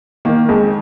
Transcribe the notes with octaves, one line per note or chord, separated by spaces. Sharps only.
D#3 A#3
F2 G#3